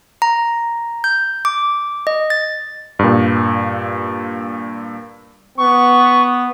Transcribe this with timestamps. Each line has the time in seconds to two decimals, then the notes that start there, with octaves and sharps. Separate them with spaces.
0.22 A#5
1.04 G6
1.45 D6
2.07 D#5
2.30 A6
2.99 G2 A#2
5.58 B3 C#6